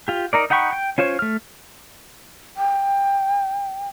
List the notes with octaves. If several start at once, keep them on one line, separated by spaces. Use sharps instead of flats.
F4 G4
D#4 A#4 D5
D#4 F#5 G5 B5 C#6
G5
C#4 F4 C5 C#5
A3 F6
G5